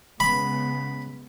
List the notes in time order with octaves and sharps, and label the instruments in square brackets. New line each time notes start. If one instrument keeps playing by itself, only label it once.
[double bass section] C#3 G#3 B3 [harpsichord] B5